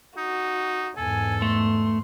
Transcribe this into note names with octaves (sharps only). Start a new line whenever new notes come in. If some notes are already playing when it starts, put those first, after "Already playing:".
D#4 F#4
E2 G#2 A4 G#5
A3 C6